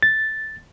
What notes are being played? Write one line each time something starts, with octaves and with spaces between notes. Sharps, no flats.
A6